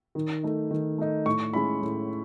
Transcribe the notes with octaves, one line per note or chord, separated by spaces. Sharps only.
D#3
A3 D#4
D#3
A3 D#4
A2 C#6
G#3 C#4 E4 B5
A2